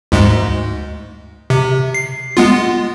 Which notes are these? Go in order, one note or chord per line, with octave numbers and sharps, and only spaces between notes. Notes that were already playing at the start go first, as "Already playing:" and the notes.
D2 G#2 G#3
C3
C7
G#3 B3 F4